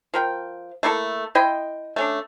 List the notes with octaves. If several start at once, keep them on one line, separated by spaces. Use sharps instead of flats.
F3 A#4 G5
A3 A#3 E4 A4
E4 D#5 G5 C6
A3 C#4 D4